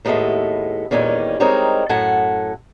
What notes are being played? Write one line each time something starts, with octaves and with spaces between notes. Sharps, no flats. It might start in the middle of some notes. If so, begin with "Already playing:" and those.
D#2 A2 G#3 B3 A4 E5
E2 A#2 D#3 G3 C#4 G#5
G3 G#3 C4 D#4 A#4 C#5
F#2 A2 A4 F#5 G#5